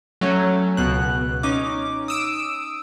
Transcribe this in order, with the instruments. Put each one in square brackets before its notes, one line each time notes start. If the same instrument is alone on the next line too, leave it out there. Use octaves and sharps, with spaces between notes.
[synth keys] F#3 A3 C#4
C#2 B2 F#6
C#4 D#4 D6
D#6 E6 D7